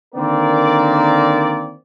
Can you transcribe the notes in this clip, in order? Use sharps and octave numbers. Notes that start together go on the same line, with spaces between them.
D3 D#3 A#3 C4 A#4 D5